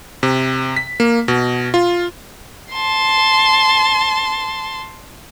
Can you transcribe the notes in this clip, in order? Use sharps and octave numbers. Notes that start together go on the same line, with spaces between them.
C3
B6
A#3
B2
F4
A5 C6